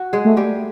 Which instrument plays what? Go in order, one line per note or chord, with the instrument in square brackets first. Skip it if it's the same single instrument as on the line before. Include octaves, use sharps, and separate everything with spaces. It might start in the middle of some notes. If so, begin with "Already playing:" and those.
Already playing: [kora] F#4
G#3 G#4
[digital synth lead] A3
[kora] G3 G4